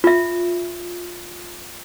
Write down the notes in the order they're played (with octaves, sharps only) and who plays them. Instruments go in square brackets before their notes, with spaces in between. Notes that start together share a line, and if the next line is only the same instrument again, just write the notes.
[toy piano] F4 E5